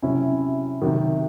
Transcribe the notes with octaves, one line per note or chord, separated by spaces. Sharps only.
C3 F#3 C#4 E4
C3 D#3 F#3